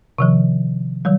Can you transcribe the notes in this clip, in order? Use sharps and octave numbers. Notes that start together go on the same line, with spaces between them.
C3 D#3 F3
D#3 F#3 G3